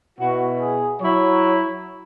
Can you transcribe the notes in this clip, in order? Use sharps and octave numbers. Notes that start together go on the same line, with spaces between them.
B2 B3 E4 F#4
G#4
F#3 E4 C#5